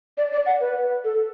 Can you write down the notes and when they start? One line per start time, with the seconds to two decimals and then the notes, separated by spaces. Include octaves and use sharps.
0.17 D5
0.32 D5
0.46 F#5
0.60 B4
1.04 A4